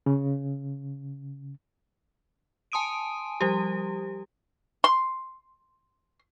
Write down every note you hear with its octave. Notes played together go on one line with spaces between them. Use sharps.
C#3
G#5 A5 C6 D#6 D7 D#7
F3 G3 G4
C6